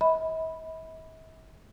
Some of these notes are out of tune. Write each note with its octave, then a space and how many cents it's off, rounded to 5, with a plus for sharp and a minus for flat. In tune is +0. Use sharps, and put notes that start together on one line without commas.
E5 -45 B5 +0